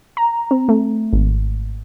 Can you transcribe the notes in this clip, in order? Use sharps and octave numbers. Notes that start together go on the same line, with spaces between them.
A#5
C4
A3
G#1